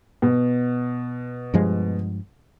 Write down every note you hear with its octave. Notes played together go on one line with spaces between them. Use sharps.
B2
G2 F3 G#3